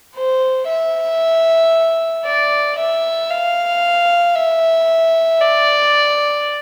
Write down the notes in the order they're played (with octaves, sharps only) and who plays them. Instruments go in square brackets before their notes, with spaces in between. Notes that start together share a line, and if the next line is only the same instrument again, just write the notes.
[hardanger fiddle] C5
E5
D5
E5
F5
E5
D5